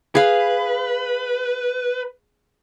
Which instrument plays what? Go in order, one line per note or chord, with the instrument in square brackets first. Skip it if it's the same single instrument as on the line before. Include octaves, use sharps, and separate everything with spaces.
[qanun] G#4 F5 [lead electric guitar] B4